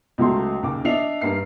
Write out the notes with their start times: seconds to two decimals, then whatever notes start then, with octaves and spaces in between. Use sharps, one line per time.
0.18 C#2 F#3 A3 C6
0.63 D#2 C#3 D6
0.85 D4 D#5 E5 C7 F7
1.21 G2 A#3 C7